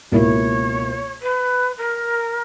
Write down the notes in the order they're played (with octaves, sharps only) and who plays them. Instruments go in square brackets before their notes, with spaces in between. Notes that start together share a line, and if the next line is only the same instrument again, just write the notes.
[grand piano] C#2 B2 A#3 E4 [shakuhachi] C#5 D5
[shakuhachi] B4
A#4